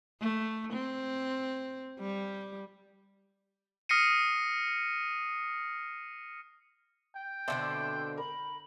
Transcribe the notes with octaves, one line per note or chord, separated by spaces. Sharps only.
A3
C4
G3
D#6 F6 A#6 C7 C#7 D#7
G5
B2 D3 C4 C5 D5 E5
A#4 B5